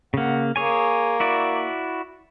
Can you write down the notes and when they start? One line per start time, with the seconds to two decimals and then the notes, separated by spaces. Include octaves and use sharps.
0.14 C#3 A#3 F#5
0.56 A#3 G#4 C#5 G#5
1.20 E4 F#4 D5